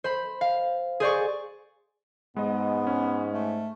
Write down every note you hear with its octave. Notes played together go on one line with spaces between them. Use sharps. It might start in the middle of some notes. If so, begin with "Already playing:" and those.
C5 B5
F5
G#4 C5 D5 C#6
G#2 G#3 B3 D#5
C#4
A3